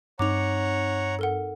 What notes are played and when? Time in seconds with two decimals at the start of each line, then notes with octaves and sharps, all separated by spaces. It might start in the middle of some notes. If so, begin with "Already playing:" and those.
0.19 G2 C4 D#4 C#5 F#5 A#5 D6 F7
1.19 A4 A#4 F#5